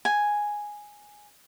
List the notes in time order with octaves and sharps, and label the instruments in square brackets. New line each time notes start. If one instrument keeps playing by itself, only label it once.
[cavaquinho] G#5